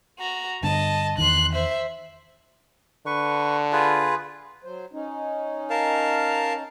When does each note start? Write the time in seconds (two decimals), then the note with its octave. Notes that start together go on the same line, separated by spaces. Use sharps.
0.19 F#4 A#5
0.63 G2 D3 D#5 A5
1.18 E2 D#3 C6 F#6
1.53 C5 E5
3.06 D3 B4 C#6
3.72 F4 G#4 B4
4.64 F#3 C5
4.93 C#4 D#4
5.70 A#4 F5 A5